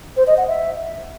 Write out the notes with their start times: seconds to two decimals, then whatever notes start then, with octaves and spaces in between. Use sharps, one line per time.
0.17 C5
0.27 D#5
0.37 F#5
0.48 E5